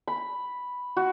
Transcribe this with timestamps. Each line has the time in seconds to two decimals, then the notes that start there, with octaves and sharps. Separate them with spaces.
0.07 B5
0.97 F#4